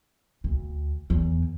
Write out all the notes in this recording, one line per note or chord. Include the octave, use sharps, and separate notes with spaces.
D2
E2